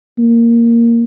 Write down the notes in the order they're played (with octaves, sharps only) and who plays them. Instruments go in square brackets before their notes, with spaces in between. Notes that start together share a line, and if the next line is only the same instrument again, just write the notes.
[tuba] A#3